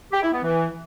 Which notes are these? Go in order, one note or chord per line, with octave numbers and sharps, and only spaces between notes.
G4
E4
B3
E3